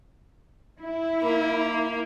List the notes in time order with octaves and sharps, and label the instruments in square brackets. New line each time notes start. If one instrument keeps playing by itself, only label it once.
[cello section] E4
[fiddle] A#3